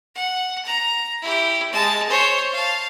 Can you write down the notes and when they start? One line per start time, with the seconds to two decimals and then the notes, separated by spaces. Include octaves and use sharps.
0.15 F#5
0.65 A#5
1.22 E4 G4
1.72 G#3 A5
2.09 C5 C#5
2.52 F5 A5